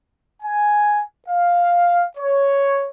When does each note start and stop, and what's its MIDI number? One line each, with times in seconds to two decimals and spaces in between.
0.42 1.01 80
1.29 2.04 77
2.17 2.88 73